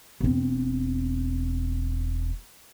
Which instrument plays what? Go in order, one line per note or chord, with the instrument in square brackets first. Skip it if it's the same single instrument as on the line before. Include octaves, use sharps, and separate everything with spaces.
[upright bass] E1 C4